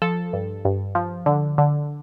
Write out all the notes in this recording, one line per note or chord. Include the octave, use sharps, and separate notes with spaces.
F3 A4
G2
G2
F3
D3
D3